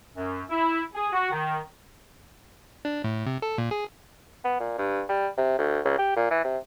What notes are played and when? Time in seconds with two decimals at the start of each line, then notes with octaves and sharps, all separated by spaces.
0.16 F#2
0.49 E4
0.94 G#4
1.13 F#4
1.31 D#3
2.85 D4
3.04 A2
3.26 C3
3.42 A4
3.58 A#2
3.71 G#4
4.44 B3
4.60 A#2
4.78 G2
5.09 G3
5.37 C3
5.59 D2
5.85 C#2
5.98 G4
6.16 A#2
6.30 E3
6.44 C3